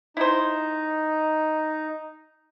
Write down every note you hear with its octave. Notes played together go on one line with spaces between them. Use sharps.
D#4 E4 C5